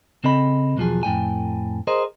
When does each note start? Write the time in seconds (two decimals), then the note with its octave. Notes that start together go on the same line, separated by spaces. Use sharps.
0.24 C#3 C4 A4 D#5 B5
0.77 B1 E2 F3 F#3 G#4
1.03 F2 A2 G5 G#5
1.87 G#4 A#4 C5 D#5